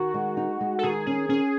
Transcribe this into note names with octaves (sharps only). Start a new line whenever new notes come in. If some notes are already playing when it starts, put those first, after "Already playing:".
Already playing: D#3 F#4
G#3
D#4
G#3
A4
D#3 G#4
C#4 G#4
C#4 G#4